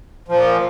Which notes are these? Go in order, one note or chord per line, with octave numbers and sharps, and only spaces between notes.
A#2 F3